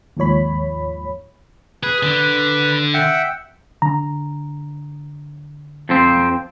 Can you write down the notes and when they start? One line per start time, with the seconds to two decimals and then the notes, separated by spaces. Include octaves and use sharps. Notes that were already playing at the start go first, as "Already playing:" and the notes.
0.17 D#2 G#2 F3 C#5 B5
1.83 G#4 B4
2.03 D3
2.94 E5 F#5 G5
3.82 D3 A#5
5.89 F2 F3 C4